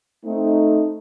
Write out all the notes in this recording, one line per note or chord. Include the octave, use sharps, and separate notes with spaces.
A3 C4 D#4